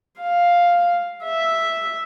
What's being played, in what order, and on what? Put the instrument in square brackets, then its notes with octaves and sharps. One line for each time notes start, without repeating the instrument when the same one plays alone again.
[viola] F5
E5